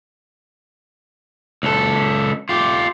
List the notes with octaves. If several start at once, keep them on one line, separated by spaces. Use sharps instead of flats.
C#2 A4
F4 G4